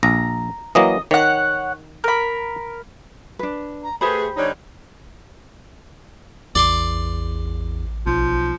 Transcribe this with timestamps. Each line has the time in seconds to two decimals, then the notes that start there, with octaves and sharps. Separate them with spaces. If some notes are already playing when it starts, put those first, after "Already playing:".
0.03 A#1 A#5
0.75 E3 F#3 A#3 D#5
1.11 D#3 C#5 F#5
2.04 A#4 B5
3.39 D4 B4
3.83 A#5
4.01 A3 G4 G#4 B4 C5 B5
4.36 D3 G3 D#4 C#5
6.55 A1 E2 D5 C6 D6
8.06 B1 F3